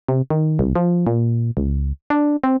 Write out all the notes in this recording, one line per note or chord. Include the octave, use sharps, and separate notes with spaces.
C3
D#3
C2
F3
A#2
C#2
D4
C4